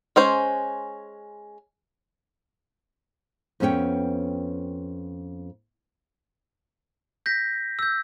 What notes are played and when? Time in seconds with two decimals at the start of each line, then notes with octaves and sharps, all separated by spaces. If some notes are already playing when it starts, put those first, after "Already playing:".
0.16 G#3 C#4 C5
3.60 F2 B3 C#4 C#5 G5
7.26 G6 A#6 B6
7.79 E6 G6